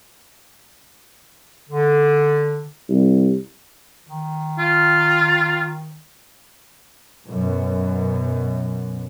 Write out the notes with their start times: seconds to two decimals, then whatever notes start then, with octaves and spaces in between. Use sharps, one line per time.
1.70 D3
2.89 C2
4.06 D#3
4.59 F4
7.26 F#2 B2